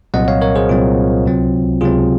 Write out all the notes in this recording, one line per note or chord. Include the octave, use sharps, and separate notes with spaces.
C2 A#2 F#3 C4 D#5 F#5
C#5 F5
A#4 C#5
G#4 C5
C2 A#2 F#3 C4 F4
C#2 C3 F#3 C4
C#2 C3 F#3 C4 F4 G#4